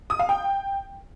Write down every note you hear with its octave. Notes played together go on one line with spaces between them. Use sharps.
D#6
F5
G5